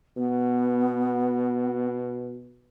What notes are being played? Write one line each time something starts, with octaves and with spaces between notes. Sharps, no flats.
B2 B3